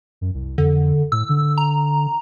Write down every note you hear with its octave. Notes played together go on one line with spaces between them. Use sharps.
F#2
C2
F2 D3
A2 E6
D3
A#5